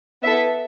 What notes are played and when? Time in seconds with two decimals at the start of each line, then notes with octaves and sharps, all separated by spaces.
0.24 B3 E4 A4 E5